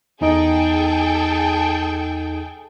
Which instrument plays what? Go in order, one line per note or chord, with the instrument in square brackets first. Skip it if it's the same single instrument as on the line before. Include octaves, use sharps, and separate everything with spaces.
[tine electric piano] E2 D#4 D#5 [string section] G#4 A4 G5